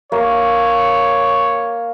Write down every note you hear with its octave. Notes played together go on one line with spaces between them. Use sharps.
A#3 C#5